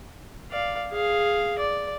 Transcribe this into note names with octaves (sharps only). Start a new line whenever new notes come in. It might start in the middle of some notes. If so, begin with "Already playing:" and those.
D5 F5
G#4 F5
D5